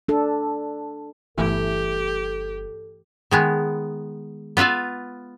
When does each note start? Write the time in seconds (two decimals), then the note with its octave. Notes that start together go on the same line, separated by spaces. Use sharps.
0.09 D4 A4
1.38 G1 E3 A3 E4 G4 A4
3.31 D#3 G#3 B3
4.57 B3 F4 B4 E5 F5